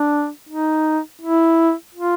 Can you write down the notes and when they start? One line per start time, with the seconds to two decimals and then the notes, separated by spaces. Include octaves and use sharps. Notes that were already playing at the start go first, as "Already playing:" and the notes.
Already playing: D4
0.49 D#4
1.22 E4
1.95 F4